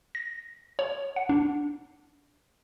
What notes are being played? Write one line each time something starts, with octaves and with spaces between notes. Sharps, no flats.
A#6
C#5
F#5
D4